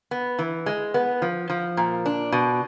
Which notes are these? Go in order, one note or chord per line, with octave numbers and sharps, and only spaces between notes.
B3
E3
G#3
B3
F3
F3
A#2
D4
B2